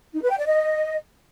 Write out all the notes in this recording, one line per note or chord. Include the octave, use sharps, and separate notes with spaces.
D#4
B4
G5
D5
D#5